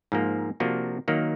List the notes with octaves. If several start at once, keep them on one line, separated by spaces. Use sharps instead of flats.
G#2 F3 A#3
C3 F3 A#3 D4 F#4
D#3 F#3 A#3